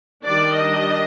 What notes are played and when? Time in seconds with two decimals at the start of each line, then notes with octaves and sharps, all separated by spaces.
0.24 D#3 G3 D4 D5
0.53 D#5